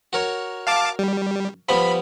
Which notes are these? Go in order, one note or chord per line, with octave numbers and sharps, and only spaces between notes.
F#4 A#4 C#5
F5 A5 D6
G3
F3 G3 B3 B5